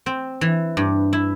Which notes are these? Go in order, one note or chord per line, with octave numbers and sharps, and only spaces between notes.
C4
E3
G2
E4